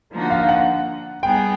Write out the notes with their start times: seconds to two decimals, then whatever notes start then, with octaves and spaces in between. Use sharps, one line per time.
0.12 D3 F3 A#3 D#4 F#4
0.30 F5
0.49 F#5
1.23 G3 B3 D#4 G#4 G5